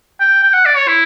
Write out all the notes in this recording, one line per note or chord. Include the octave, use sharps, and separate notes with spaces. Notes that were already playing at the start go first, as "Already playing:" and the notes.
G5
G5
F#5
D5
C#5
E4